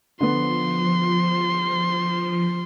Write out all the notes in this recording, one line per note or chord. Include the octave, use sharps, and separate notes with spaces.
D3 F3 B3 C6